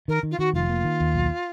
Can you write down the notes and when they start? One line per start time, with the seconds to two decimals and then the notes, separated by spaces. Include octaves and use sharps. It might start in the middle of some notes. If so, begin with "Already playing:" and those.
0.08 D#3 A#4
0.23 D#3
0.31 F4
0.39 D#3 F#4
0.54 F1 F4
0.69 A#3
0.84 D#3
1.00 D#2
1.15 B1